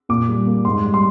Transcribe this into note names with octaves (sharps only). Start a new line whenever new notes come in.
A#2 D6
G3
A#3
G#2 C6
G3
C6